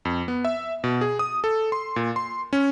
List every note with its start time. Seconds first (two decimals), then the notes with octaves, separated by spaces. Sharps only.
0.05 F2
0.28 B3
0.45 E5
0.84 B2
1.01 G#4
1.19 D#6
1.44 A4
1.72 C6
1.96 A#2
2.16 C6
2.53 C#4